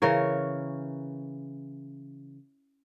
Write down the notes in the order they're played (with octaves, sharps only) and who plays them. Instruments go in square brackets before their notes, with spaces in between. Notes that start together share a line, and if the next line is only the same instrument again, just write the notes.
[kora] C#3 E3 A#4 C#5